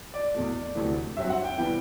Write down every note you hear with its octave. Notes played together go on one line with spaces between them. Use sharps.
D5
E2 B2 A3
D2 C3 E3 A3
G2 F#3 C4 E5
F#5
G5
C3 E3 G3 B3 G5